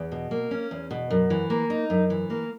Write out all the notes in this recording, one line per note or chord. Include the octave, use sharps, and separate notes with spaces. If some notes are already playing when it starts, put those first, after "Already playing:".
Already playing: E2
B2
A#3
C#4
E2
B2
F#2
E3
A#3
D#4
F#2
E3
A#3